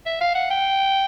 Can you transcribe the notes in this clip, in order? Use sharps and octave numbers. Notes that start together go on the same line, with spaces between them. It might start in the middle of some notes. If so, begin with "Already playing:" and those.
E5
F5
F#5
G5